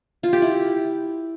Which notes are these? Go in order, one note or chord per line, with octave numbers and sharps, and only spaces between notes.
F4
G4
E4